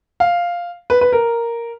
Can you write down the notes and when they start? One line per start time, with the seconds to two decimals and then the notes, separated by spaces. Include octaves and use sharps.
0.20 F5
0.90 B4
1.01 B4
1.12 A#4